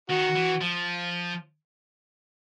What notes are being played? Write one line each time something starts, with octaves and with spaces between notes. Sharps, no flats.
D#3 F#4
E3
F3